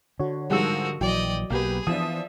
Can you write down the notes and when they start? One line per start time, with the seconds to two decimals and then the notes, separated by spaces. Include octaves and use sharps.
0.20 D3 F#4 C#5
0.50 G#2 F3 G3 G#3 F#4 A#4 F#5 E6
1.01 A#1 E3 F#3 D5 D#5 G5
1.50 B1 A#3 B3 G4 G#4 B4
1.87 E3 F3 B3 D4 E5 D#6